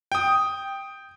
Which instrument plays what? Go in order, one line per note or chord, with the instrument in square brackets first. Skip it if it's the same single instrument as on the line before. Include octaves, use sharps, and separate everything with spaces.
[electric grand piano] G5 D#6